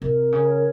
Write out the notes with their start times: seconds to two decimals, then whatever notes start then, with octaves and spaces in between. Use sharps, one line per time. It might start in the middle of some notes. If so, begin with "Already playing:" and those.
0.02 C3 A#4
0.32 C#3 C#5